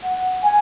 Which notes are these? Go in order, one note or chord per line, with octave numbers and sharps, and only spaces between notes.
F#5
G#5